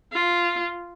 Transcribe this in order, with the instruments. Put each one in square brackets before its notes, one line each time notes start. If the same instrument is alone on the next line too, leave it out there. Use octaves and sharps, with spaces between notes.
[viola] F4